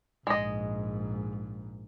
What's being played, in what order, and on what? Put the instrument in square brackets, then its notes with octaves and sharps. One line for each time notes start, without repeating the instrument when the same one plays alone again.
[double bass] A#1 G#2 [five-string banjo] G#3 D#5